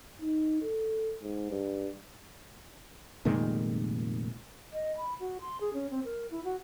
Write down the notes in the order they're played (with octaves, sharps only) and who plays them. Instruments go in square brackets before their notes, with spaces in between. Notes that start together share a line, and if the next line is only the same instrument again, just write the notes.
[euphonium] D#4
A4
G#2
G2
[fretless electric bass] F1 A#2 D#3 G#3
[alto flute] D#5
B5
F#4
C6
G#4
C#4
C4
A#4
E4
F#4